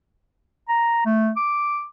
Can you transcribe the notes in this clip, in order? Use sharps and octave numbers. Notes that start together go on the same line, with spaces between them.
A#5
A3
D6